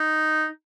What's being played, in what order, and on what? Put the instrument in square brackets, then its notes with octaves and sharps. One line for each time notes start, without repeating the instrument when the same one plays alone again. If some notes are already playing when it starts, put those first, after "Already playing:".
Already playing: [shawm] D#4